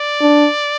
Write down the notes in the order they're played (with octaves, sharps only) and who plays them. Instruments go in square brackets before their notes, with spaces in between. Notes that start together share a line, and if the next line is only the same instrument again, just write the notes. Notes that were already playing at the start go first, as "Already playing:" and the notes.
Already playing: [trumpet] D5
[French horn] D4